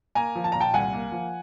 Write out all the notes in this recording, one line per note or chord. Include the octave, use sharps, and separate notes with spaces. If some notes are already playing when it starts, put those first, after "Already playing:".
A#3 G#5 A#5
F3
A5
A#2 A#5
G5 A5
C2 F#5 G#5
A#3
F3